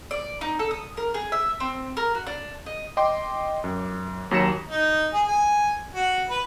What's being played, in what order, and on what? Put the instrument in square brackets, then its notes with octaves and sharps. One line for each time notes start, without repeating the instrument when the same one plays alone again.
[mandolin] D5
D#4
A4
D#6
A#4
G#4
E5
C4
A#4
F#4
D4
D#5
[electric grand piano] D#5 G5 C6 D6
F#2
D#2 F#3 A#5 A#6 C#7 E7
[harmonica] D#4
G#4
G#5
F#4
B4